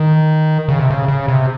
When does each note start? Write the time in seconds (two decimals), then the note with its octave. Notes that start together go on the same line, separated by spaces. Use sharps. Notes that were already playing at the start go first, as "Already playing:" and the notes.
Already playing: D#3
0.69 C#3
0.79 C3
0.90 C#3
1.08 C#3
1.28 C3